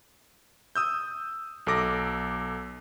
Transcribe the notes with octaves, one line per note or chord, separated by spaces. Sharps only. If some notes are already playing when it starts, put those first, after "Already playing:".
D#6 E6 G6
B1 A4 D6 A#6